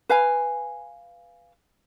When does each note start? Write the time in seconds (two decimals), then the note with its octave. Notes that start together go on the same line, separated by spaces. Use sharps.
0.09 B4 F5 G#5